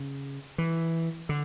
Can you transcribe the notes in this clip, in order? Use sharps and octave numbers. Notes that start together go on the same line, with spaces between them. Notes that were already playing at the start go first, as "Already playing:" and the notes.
Already playing: C#3
E3
D3